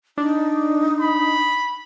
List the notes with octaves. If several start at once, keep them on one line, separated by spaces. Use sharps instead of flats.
D4 D#4
B5